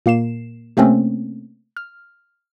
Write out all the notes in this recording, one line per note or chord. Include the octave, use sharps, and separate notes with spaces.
A#2 A#3 C7 E7
C3 A3 A#3 C4 C#4
F6